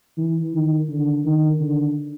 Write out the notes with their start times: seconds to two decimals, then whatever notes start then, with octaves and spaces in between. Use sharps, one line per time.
0.17 E3
0.53 D#3
0.89 D3
1.25 D#3
1.61 D3